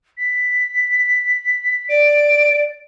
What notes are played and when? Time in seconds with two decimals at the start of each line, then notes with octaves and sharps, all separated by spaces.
0.18 B6
1.89 D5 D7